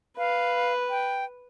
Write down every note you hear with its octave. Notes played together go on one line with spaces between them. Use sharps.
B4 F5
G5